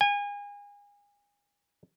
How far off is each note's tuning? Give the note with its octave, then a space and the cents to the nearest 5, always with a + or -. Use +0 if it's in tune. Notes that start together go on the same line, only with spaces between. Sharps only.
G#5 -30